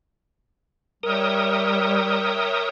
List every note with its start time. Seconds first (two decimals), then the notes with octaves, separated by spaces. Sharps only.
1.03 G3 A#4 C#5 E5 G5 D#6